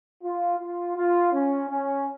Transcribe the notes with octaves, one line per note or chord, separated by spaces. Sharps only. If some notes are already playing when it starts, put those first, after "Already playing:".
F4
F4
F4
C#4
C#4